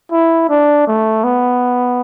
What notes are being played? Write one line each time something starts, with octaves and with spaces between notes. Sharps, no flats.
E4
D4
A3
B3